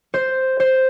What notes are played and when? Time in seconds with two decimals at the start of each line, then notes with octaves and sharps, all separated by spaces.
0.14 C5
0.60 C5